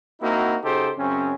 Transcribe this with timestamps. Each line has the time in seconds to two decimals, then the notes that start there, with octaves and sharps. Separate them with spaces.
0.22 A#3 C4 D#4 E4 F#4
0.64 C#3 D#4 F#4 G4 A4 C5
0.98 F#2 C#3 C4 C#4